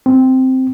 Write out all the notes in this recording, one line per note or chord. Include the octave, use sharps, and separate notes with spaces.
C4